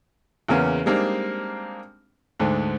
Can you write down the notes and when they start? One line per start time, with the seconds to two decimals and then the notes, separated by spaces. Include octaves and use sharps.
0.49 E2 C#3 A#3 B3 C#4
0.86 G3 G#3 A#3 C4 D4 D#4
2.40 D2 G#2 D3